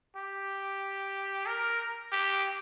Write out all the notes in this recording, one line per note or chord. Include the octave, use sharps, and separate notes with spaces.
G4
A#4
G4